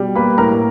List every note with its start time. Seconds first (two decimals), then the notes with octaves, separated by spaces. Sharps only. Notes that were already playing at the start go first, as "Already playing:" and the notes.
Already playing: B2 G3
0.15 A#3 B4 B5
0.38 A2 A#4 A#5